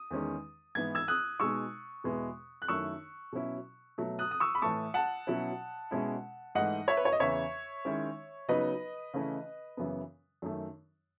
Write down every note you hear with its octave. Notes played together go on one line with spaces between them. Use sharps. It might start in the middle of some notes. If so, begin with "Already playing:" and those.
Already playing: D#6
E2 D#3 G#3 C#4
G#2 E3 B3 G#6
E6 G#6
D#6 F#6
B2 G#3 D#4 C#6 E6
E2 B2 G#3 B3 E4
F#6
F#2 D#3 A3 E4 C#6 E6
B2 F#3 C#4 E4
B2 F#3 A3
D#6 F#6
D#6
C#6 E6
B5
A2 E3 A3 A5 C#6
F#5 A5
B2 F#3 C#4 E4
B2 G#3 C#4 E4
G#2 E3 A3 D#5 F#5
C#5 E5
B4
C#5
D#5
E2 C#3 E3 C#5 E5
D#3 G#3 C#4 E4
C#3 F#3 B3 D#4 B4 D#5
C#3 E3 A3 C#4 E4
F#2 C#3 E3 B3
F#2 D#3 A3